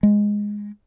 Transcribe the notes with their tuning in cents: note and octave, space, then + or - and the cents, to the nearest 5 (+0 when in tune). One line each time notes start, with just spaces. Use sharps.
G#3 -5